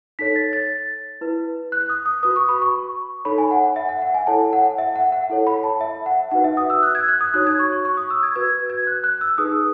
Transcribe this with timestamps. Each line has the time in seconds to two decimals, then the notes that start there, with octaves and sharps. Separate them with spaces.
0.19 D#4 A4 C#5 B6
0.36 A6
0.53 A6
1.21 E4 B4
1.72 F#6
1.89 D#6
2.06 D#6
2.23 F#4 B4 D#6
2.36 C#6
2.49 B5
2.62 C#6
3.25 D#4 A4 C#5 B5
3.38 G#5
3.51 F#5
3.63 F#5
3.76 E5
3.89 F#5
4.02 F#5
4.14 G#5
4.27 E4 A4 C#5 A5
4.53 F#5
4.78 E5
4.96 F#5
5.12 F#5
5.30 E4 A4 C#5
5.47 B5
5.64 A5
5.81 E5
6.06 F#5
6.31 D#4 F#4 B4 F#5
6.44 E5
6.57 D#6
6.70 E6
6.83 F#6
6.95 G#6
7.08 F#6
7.21 D#6
7.34 D#4 F#4 C#5 F#6
7.47 G#6
7.59 C#6
7.72 C#6
7.85 C#6
7.97 D#6
8.10 E6
8.23 G#6
8.36 F#4 B4 G#6
8.70 G#6
8.87 F#6
9.04 F#6
9.21 E6
9.38 D#4 G#4 B4 D#6